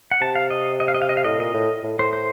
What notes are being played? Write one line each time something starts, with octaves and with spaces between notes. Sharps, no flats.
F#5
C3 A5
F5
D#5
D#5
F5
D#5
F5
D#5
F5
A2 D#5
A#2 D#5
A2
A2
A2 C5
C5